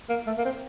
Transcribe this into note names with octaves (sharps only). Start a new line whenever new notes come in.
A#3
A3
A#3
C4